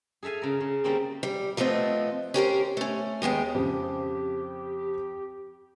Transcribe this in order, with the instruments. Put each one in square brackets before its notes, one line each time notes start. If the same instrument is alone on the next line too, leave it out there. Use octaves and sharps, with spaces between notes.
[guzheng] G#4 A4 E5 F5 G#5
C#3 G#4 A#4
C#3
G3 A#3 C4 C#4
[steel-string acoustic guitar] G3
F3 A3 B3 C4 D#5
C#4 G4 A#4 C5
A3 C#4
D#2 G#3 B3 G5
[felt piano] F2 C#3 C4 [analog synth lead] G4